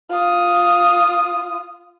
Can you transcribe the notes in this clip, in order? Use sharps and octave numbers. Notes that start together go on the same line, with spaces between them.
F4 D#6